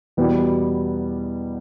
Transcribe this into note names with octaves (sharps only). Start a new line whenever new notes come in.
E2 B2 G3 B3